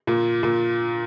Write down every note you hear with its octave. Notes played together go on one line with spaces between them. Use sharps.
A#2
A#2